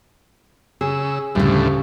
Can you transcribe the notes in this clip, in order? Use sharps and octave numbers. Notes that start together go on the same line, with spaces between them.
C#3 G#4 E6
D2 A2 C#3 G3